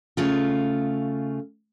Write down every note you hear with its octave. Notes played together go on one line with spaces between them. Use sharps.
C#3 A3 F4